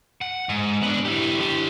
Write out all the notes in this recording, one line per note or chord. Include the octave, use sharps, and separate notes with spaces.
F#5
G#2
B3 D4
E4 G4
D3 G4